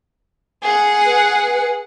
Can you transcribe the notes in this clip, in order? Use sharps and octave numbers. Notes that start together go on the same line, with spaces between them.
G#4 F#5
B4